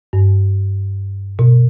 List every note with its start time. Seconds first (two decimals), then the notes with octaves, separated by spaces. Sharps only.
0.13 G2
1.39 B2